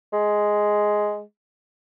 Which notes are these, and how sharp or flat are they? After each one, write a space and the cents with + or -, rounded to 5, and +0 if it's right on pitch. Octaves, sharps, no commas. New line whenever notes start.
G#3 +5